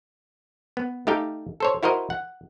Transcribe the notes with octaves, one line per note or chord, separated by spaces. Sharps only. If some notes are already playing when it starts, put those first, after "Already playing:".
B3
A3 D#4 G4 F5 G5
A4 C5 C#5
E4 F#4 A#4 C5 D#5
F#5